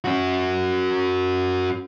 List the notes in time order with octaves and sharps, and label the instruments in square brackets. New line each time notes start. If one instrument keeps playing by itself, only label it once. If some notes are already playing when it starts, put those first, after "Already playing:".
[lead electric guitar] C#4 F#4